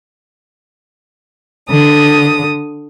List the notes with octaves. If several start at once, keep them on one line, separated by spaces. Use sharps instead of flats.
D3 D#6